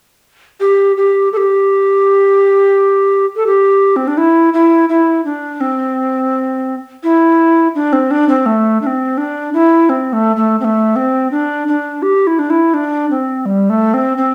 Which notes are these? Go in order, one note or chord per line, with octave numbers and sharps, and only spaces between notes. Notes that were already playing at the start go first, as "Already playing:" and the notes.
G4
G4
A4
G4
A4
G4
C4
D4
E4
E4
E4
D4
C4
E4
D4
C4
D4
C4
A3
D4
C4
D4
E4
C4
A3
A3
C4
A3
C4
D4
D4
G4
E4
D4
E4
D4
C4
G3
A3
C4
C4